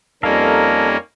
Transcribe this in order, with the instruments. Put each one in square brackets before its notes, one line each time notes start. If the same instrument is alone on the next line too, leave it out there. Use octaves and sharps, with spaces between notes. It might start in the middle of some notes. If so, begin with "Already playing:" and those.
[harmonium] F2 G3 D#4 [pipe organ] A#3 C#4 [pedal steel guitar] A4 A#4 F5